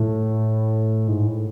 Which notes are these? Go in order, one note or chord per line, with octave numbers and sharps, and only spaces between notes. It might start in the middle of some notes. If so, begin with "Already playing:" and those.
Already playing: A2
G#2
A2